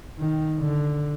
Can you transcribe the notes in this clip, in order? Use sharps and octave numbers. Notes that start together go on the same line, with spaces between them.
D#3
D3